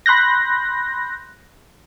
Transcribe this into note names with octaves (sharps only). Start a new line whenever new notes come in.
B5 C6 F#6 G6 A#6